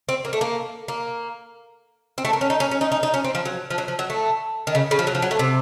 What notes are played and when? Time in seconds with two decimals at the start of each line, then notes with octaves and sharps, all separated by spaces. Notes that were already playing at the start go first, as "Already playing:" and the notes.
0.09 C4
0.25 A#3
0.33 A3
0.41 A#3
0.88 A#3
2.18 C4
2.25 A3
2.33 A#3
2.41 C#4
2.50 D#4
2.60 C#4
2.71 C#4
2.81 D#4
2.92 D#4
3.03 D#4
3.14 C#4
3.24 C4
3.35 F3
3.45 F#3
3.70 F3
3.78 F#3
3.88 F3
3.99 F#3
4.10 A3
4.67 D#3
4.75 C#3
4.91 C#3
4.99 F3
5.07 F#3
5.15 F3
5.22 F#3
5.31 A3
5.39 C3